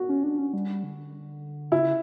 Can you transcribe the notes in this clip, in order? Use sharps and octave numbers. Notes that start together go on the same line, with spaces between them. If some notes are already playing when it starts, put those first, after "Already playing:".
Already playing: F#4
C#4
D4
C#4
G3
D3
C#3 E4